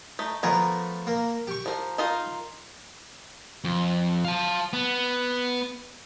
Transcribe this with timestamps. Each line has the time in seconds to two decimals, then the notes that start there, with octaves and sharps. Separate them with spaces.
0.19 A3 D#4
0.43 F3 A3 B3 A#4 G#5 A#5
1.07 A#3
1.47 G4 C#6
1.66 F3 A#4
1.98 D#4 F4 A#4
3.64 F2
4.25 F5 A5
4.73 B3